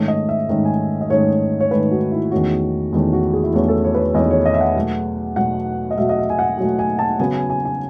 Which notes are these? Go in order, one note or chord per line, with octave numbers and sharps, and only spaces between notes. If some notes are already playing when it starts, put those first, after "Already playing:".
Already playing: G#2 D#3 A3 C#4
D#5
E5
G#2 D#3 A3 C#4
G#5
D#5
G#2 D#3 A3 C#4 C#5
C#5
G#2 D#3 A3 C#4 B4
F#4
E4
E2 D#3 A3 C#4 F#4
E2 D#3 A3 C#4
F#4
G#4
E4
E2 D#3 A3 C#4 F#4
A4
C#5
B4
C#5
E2 D#3 A3 C#4 D#5
C#5
D#5
E5
F#5
B2 F#3 A3
B2 F#3 A3 F#5
D#5
B2 F#3 A3 E5
D#5
E5
G#5
F#5
B2 F#3 A3 G#5
G#5
A5
C#3 F#3 B3 G#5
G#5
G#5
G#5